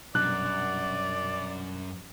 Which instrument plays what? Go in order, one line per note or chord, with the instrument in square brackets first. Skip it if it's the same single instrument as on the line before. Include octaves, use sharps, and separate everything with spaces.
[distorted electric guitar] F#2 [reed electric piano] B2 G3 D4 [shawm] D5 [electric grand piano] F#6